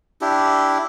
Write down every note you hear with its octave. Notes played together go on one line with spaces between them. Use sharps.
D4 E4 G4